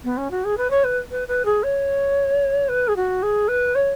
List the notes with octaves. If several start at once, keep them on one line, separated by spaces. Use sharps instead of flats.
B3
C#4
F#4
G#4
B4
C#5
B4
B4
B4
G#4
C#5
B4
G#4
F#4
G#4
B4
C#5